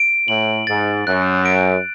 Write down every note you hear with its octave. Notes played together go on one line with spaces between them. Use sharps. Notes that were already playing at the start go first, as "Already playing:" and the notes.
Already playing: D7
A2 F#7
G#2 A6
F#2 F#6
D7